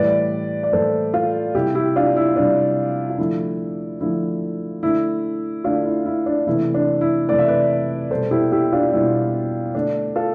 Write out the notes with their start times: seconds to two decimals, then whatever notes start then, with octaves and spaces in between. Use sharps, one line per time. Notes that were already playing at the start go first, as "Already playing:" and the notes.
Already playing: A2 E3 G3 B4 D5
0.63 D5
0.72 A2 E3 G3 A4 C5
1.14 F4 A4
1.54 C3 G3 E4 G4
1.75 E4 G4
1.96 D4 F4
2.16 E4
2.36 C3 G3 D4
3.09 F4
3.19 D3 F3 A3 E4
4.01 D3 F3 A3 E4
4.83 D3 A3 E4
5.64 D3 A3 D4 F4
5.85 E4
6.06 E4
6.26 D4
6.47 C3 E3 A3 E4
6.74 D4
7.01 E4
7.29 C3 E3 A3 D5
7.39 E5
7.48 B4 D5
8.10 B2 G3 A4 C5
8.31 E4 G4
8.52 E4 G4
8.72 D4 F4
8.93 B2 G3 E4
9.75 D3 A3 D4
10.16 F4 A4